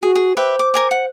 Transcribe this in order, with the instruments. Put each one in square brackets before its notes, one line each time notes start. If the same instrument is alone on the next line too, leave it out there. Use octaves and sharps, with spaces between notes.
[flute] F#4 [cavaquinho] G#4
[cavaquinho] G#4
[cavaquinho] G4 B4 E5 [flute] C5
[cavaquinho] D6
A#4 G#5 D6
F#5